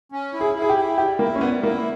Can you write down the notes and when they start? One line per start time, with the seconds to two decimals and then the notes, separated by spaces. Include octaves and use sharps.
0.12 C#4
0.34 E4
0.41 G#4
0.55 E4
0.62 G#4
0.69 G4
0.76 E4
0.98 G3 G4
1.19 A#3 E4
1.35 C#4
1.41 G3 B3
1.63 A#3 E4